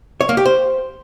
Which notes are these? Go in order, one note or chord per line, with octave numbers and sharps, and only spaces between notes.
C#5
A#3
G4
C5